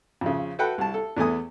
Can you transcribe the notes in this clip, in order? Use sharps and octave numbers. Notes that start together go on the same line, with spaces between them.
F2 C#3
F#4 A4 B4 F#5 G5
C2 A5
A4
E2 A3 B3 G#5 D#6